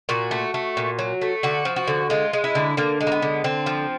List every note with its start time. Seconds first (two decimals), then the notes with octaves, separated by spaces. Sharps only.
0.09 A#2 F#4
0.31 A3
0.54 A3
0.77 A#2
0.99 F#3
1.22 A3
1.43 D3 F#4
1.65 F3
1.76 F#4
1.88 D3
2.10 G#3 F4
2.33 G#3
2.44 E4
2.55 D3
2.77 D3 A#3
3.01 G#3
3.07 A#3
3.12 B3
3.22 D3
3.44 D3 C4
3.66 F3